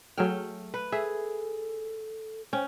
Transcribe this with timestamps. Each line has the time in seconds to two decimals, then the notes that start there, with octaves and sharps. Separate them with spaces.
0.18 F#3 A3 G#4 G5 F6
0.74 B4
0.92 G#4 A4 E5
2.53 C#4 C5 G5